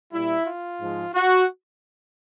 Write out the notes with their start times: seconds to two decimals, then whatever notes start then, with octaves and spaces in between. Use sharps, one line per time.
0.12 A#2 G3 E4
0.47 F4
0.81 G#2 F3 G#3
1.14 F#4